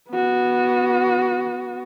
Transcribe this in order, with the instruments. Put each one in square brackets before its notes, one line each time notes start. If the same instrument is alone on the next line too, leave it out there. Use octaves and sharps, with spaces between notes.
[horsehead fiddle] B3 F#4